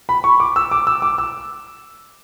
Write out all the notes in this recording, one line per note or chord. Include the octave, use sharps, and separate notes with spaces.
B5
C#6
D6
E6
D6
E6
D6
E6